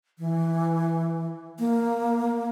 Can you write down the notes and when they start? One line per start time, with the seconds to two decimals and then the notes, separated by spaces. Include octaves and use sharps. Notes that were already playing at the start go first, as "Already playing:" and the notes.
0.19 E3
1.59 A#3